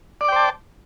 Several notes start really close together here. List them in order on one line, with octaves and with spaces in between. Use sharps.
D5 D6 G5 C5 A5